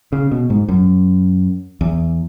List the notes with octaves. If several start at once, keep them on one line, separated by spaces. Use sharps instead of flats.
C#3
B2
G#2
F#2
E2